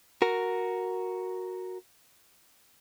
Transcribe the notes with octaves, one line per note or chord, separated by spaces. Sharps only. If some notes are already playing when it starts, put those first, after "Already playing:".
F#4 A#4